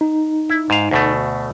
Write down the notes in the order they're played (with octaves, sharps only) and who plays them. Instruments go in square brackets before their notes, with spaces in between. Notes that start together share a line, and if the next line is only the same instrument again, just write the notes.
[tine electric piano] D#4
[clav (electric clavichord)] E4
G#2 F5
D2 B2 A3